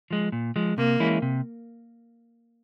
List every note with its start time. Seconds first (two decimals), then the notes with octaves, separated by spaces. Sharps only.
0.11 F3 G#3
0.32 A#2
0.56 F3 G#3
0.77 C3 A#3
1.00 E3 G#3 C#4 E4
1.22 C3